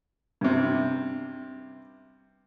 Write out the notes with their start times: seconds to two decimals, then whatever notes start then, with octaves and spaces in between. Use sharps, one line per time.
0.41 G2 C3